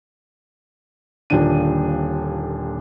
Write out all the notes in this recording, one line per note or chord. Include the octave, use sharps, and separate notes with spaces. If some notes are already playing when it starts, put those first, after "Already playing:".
D#1 D#2 A#2 D3 D4 D#7